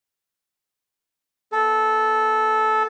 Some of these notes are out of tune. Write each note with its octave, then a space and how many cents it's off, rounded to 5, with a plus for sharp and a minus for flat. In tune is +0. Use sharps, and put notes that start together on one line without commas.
B3 +0 A4 -15